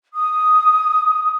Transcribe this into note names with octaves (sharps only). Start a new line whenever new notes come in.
D#6